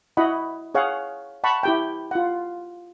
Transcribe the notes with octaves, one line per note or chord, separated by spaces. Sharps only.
E4 F#4 D#5 F#5 B5
G#4 C#5 F5 F#5
F#5 A5 B5 C#6
E4 G4 G5
F4 F#5